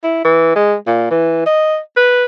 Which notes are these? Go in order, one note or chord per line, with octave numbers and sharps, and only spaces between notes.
E4
E3
G#3
A#2
E3
D#5
B4